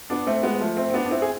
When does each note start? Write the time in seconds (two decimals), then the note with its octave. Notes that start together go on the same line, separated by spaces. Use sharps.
0.10 B3 D4
0.27 A3 C4
0.43 G#3 B3
0.61 F3 A3
0.77 A3 C4
0.90 C4
0.94 B3 D4
1.05 D4
1.11 C4 E4
1.22 G#4